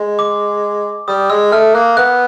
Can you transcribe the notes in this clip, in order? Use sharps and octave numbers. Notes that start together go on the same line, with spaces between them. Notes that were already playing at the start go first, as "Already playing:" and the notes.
Already playing: G#3
D6
G3 D#6
G#3 E6
A3 F6
A#3 F#6
B3 F#6